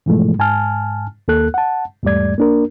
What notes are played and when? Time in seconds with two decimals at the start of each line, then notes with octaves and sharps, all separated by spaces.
0.06 G#2 B2 E3 F3 G#3 A3
0.39 G#2 G#5 A5 F6
1.28 D#2 A#3 A4 F#6
1.54 F#5 A5
2.03 E2 G#2 G3 A3 D5 G#6
2.38 A#3 D4 A#4